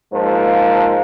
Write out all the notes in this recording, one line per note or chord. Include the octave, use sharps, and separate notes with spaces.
G#2 F3 A#3